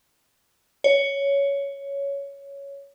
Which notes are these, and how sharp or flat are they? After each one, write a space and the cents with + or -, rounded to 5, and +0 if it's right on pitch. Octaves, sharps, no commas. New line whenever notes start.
C#5 +10